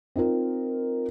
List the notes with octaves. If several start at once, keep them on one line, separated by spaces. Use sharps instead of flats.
C4 D#4 F4 A#4